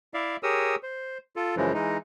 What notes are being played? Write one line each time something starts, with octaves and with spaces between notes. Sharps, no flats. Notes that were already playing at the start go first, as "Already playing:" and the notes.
E4 D5 E5 F5
G4 G#4 A#4 C#5 D#6 E6
C5
F4 A4
F#2 C#3 E3 F3 G#3
E3 G#3 D#4